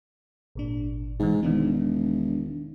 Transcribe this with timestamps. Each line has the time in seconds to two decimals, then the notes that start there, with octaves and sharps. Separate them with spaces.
0.55 G#1 A#2 D4
1.20 G#2 B2 E3
1.43 E1 D#3 D4 D#4